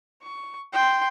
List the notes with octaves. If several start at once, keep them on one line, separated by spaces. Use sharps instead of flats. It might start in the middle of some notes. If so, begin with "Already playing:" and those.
C#6
G5 C6